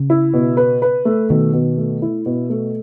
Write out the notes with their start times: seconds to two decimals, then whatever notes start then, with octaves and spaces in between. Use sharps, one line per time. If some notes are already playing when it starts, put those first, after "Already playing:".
Already playing: C#3
0.10 E4
0.33 B2
0.57 B4
0.82 B4
1.05 A3
1.30 B2 D#3
1.53 B2
1.78 A3
2.02 E4
2.26 B2
2.50 A3